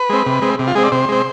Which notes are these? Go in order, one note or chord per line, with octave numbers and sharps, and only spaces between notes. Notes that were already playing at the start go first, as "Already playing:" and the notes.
Already playing: B4
G#3 C4
C3
G#3 C4
C3
F4
G#3 C4 G#4
D5
C3 C5
G#3 C4